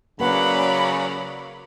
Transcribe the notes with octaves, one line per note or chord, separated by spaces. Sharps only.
C#3 F#3 A#3 B4 D5 F#5 B5